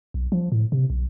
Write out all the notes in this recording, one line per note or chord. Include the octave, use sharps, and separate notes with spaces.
B1
F3
A2
C3
B1